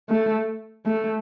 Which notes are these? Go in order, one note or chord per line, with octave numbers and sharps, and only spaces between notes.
A3
A3